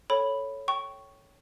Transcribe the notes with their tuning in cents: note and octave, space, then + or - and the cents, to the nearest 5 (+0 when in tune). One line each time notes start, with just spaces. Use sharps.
A4 +0 C#5 +0 B5 +0
G5 -15 C#6 +0